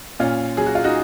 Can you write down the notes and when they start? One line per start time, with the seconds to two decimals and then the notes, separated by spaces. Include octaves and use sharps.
0.19 A#2 C#4 F4
0.57 F#3 G#4
0.66 F#4
0.75 F4
0.84 D#4 F#4